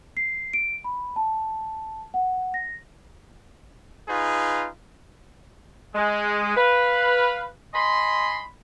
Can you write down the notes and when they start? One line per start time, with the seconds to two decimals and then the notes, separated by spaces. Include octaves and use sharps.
0.17 C7
0.53 D7
0.84 B5
1.16 A5
2.14 F#5
2.54 A#6
4.09 D#4 F4 G#4 B4
5.95 G#3
6.57 B4 F5
7.74 D#5 G#5 B5 C6